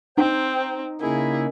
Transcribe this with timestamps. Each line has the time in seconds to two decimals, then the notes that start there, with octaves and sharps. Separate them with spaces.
0.17 C4 D#4 C5 G5
1.01 C#3 A#3 D#4 E4 G#4